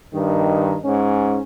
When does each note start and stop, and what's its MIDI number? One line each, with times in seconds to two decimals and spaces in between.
0.14 0.77 43
0.14 0.77 51
0.84 1.41 44
0.84 1.41 61